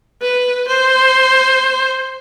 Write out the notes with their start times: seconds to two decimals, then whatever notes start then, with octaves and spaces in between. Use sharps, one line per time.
0.22 B4
0.68 C5